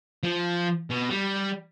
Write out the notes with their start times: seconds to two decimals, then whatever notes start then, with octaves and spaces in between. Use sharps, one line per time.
0.23 F3
0.90 B2
1.10 G3